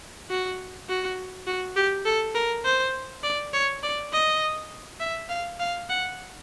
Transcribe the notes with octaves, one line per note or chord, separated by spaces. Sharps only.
F#4
F#4
F#4
G4
A4
A#4
C5
D5
C#5
D5
D#5
E5
F5
F5
F#5